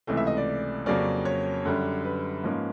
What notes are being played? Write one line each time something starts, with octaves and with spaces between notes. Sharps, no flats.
C#2 C3 E3 A3
E5
D#5
D5
F2 C#3 F#3 A#3 C#4 D5
C#5
F#2 D3 G3
B4
G#2 F3 A#3 C#4